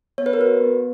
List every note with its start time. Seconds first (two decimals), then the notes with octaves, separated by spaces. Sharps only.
0.18 B3 C#5
0.26 B4
0.33 A#4
0.39 F#4 B4
0.61 B3